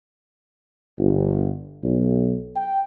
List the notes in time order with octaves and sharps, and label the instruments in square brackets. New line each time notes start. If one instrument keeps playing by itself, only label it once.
[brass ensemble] G1
B1
G5